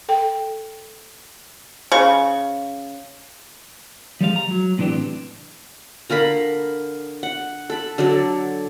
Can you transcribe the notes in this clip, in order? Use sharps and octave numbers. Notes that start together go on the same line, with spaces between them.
A4 G5
C#3 C#6
F3 G3 G#3 F5
A#5
F#3
A2 C3 E3 D4 G4
D3 A#4 F5 B5
F#5
A4 B5
D3 F#3 A4 D5